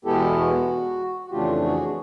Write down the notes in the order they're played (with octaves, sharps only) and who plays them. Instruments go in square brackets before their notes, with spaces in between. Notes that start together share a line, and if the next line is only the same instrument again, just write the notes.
[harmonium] E2 B2 G#3 B3 E4 G4 A4
F#4
F#4
F2 C#3 E3 A3 D4 F4 G4
F#4 G#4